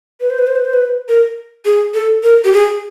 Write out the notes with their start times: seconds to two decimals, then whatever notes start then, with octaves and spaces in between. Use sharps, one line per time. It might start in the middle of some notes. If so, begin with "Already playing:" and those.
0.20 B4
0.30 C5
0.39 B4
0.47 C5
0.56 B4
0.65 C5
0.73 B4
1.08 A#4
1.65 G#4
1.94 A4
2.23 A#4
2.44 G4
2.53 G#4